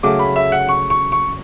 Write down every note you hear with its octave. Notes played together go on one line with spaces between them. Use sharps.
C#3 F#3 A3 D6
B5
E5
F#5
C#6
C#6
C#6